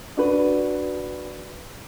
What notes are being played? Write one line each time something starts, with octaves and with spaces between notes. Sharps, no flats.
D4 F#4 B4